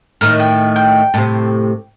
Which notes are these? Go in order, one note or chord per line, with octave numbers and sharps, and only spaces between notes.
A2 D#3 A#4
G5
G5
A2 C3